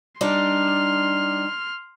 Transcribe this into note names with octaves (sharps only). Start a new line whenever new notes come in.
G3 D4 D#4 C6 F6